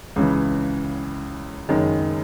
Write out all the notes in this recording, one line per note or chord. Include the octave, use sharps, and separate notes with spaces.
C#2 C#3 E3
F#1 F#2 D#3 G#3